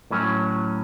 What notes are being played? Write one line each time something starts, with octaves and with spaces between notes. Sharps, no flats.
A2 F#3 C#4